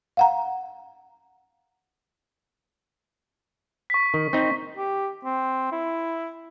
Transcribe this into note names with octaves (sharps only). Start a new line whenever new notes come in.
F5 F#5 A#5
C#6 B6
D#3
C4 D#4
G4
C4
E4